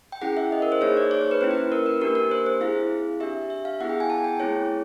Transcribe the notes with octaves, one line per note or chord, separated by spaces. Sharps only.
G5
C#4 E4 G#4 F#5
E5
D#5
A#4
C5
A#3 D#4 G#4 C#5
D5
C#5
C5
B4
A#3 C#4 E4 C5
B4
A#4
B4
A#3 D4 G4 A#4
A#4
C5
C5
C4 E4 G#4 F5
D4 G4 E5
E5
F5
B3 E4 G#4 F#5
G5
G#5
A5
G5
A3 C4 E4 G#4 C#5